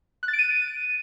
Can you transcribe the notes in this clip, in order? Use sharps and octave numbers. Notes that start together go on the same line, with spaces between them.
F#6
A6
D7
D#7